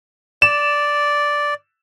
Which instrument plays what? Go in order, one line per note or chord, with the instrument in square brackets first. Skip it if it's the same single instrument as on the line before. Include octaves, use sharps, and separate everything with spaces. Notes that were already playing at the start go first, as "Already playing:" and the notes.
[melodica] D5 [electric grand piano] E7